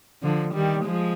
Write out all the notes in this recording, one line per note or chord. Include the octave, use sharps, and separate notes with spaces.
D3 F3
D#3 G3
F3 G#3